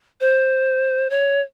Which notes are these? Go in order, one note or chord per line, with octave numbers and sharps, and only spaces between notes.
C5
C#5